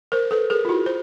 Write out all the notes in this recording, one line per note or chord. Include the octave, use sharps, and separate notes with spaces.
A#4 C5
A4 B4
G#4 A#4
F4
E4 F#4
C5